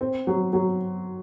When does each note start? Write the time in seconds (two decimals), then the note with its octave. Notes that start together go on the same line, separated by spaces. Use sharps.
0.01 C4
0.27 F#3
0.53 F#3